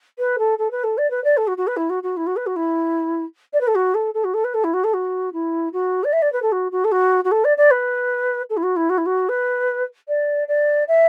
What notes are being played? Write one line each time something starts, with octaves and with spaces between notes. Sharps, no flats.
B4
A4
A4
B4
A4
D5
B4
D5
A4
F#4
F#4
B4
E4
F#4
F#4
E4
F#4
B4
F#4
E4
D5
B4
A4
F#4
A4
A4
F#4
A4
B4
A4
E4
F#4
A4
F#4
E4
F#4
D5
E5
D5
B4
A4
F#4
F#4
A4
F#4
F#4
A4
D5
D5
B4
A4
E4
F#4
E4
F#4
E4
F#4
B4
D5
D5
E5